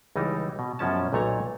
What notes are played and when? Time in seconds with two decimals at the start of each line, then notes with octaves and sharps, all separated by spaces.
0.16 C#2 E3 G3 D#4
0.59 B2
0.79 F#2 B2 F3 C#4 A5
1.13 B1 A#2 A3 C#5 A#5